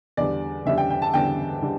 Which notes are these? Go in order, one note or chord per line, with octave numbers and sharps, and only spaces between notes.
E2 D3 G3 D5
E2 D3 G3 E5
G5
G5
A5
E2 D3 G3 G5
D3 G3